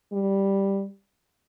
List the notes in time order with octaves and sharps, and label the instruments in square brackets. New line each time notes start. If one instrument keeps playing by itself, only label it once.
[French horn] G3